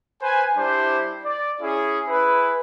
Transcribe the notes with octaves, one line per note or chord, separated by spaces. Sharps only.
B4 C5 G#5
G3 D4 E4 G4 C5
D5
C#4 E4 G#4
E4 G#4 B4